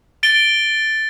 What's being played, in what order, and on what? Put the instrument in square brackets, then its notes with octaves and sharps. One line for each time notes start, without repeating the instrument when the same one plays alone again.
[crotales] A6 D7 G7